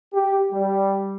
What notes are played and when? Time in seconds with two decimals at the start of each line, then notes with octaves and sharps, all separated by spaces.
0.13 G4
0.52 G3